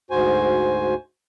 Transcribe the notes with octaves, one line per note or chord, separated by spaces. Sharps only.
D2 G#2 F#4 C5 G#5